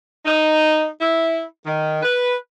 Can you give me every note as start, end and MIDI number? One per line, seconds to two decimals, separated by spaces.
0.25 0.87 63
1.00 1.43 64
1.65 2.02 51
2.02 2.34 71